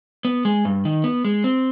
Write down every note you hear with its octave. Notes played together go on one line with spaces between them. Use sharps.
B3
G#3
G2
D#3
B3
G#3
C4